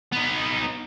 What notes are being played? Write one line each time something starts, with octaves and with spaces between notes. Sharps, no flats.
B3 D#4